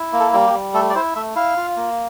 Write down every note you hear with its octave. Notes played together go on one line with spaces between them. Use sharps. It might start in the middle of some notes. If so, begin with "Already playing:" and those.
Already playing: E4
A#3
A4
G3
G4
G3
A3 A4
D5
E4 C5
A3 E5
E4 F5
F4
A#3